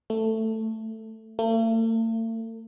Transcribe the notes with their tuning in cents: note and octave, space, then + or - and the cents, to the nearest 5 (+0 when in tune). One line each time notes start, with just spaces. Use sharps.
A3 +10
A3 +45